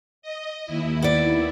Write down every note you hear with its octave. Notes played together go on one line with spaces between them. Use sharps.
D#5
D#2 E4
B3 D5